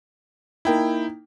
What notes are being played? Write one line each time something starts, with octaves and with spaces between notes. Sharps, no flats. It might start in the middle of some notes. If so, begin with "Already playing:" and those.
A#3 D#4 E4 G5